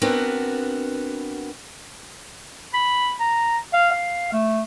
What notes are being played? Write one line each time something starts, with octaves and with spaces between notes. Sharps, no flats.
B3 C4 D4 F#4 A#4 B4
B5
A#5
F5
F5
A3